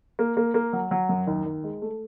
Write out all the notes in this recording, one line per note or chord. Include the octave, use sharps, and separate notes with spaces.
A#3
A#3
A#3
F#3
F#3
F#2
D#2
D#2
G#3
A3